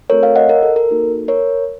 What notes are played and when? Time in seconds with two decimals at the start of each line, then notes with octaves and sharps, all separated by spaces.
0.10 A3 C4 F#4 A4 A#4 C#5
0.23 C#5 F5
0.36 D#5 F#5
0.49 A#4
0.63 A4
0.76 A#4
0.89 A#3 D#4 F#4 A4
1.28 A#4 C#5